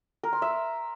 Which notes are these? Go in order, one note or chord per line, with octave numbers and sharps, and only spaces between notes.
A#4
C6
E5